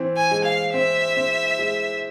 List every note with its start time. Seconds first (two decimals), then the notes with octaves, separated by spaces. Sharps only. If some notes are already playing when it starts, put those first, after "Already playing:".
Already playing: E3 C4
0.17 G#5
0.31 G#3
0.45 F5
0.74 C4 E5
1.17 C4
1.59 G#3